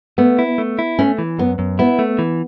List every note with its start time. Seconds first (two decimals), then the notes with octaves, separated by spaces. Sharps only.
0.18 A3 B3
0.39 E4
0.58 A3
0.79 E4
0.99 A3 C#4
1.19 E3
1.39 F#2 B3
1.59 F#2
1.79 B3 E4
1.99 A3
2.19 E3